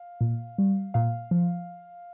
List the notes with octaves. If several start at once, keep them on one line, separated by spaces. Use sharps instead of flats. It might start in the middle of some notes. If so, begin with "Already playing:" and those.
Already playing: F5
A#2
G3
A#2 F5
F3